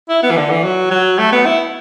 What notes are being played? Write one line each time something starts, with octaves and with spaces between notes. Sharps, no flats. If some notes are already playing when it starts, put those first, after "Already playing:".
E4
B3
E3
D3
E3
F#3
F#3
A3
B3
E4